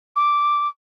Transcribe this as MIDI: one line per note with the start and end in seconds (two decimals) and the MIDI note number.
0.16 0.68 86